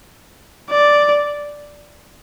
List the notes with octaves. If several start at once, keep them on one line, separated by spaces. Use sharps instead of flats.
D5